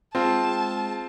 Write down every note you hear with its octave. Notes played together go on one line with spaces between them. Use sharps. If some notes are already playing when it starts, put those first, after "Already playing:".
G#3 C4 F4 G#4 A5